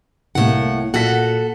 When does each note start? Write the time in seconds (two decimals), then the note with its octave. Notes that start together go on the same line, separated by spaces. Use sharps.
0.35 C2 A2 A#3 F#5
0.94 A#2 F#4 A4 F#5 B6